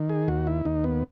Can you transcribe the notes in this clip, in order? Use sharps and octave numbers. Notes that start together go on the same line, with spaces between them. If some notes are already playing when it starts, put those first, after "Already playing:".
Already playing: D#3
G#4
D#2 F#4
E4
D#2 D#4
B3